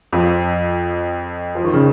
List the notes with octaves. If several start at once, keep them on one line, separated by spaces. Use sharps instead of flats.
F2 F3
F3
D#3
C#3